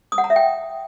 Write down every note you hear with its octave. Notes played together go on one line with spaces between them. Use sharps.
D#6
F#5
A#5
E5
G5